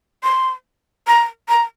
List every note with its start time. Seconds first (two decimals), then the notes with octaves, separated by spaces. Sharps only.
0.23 C6
1.07 A#5
1.49 A#5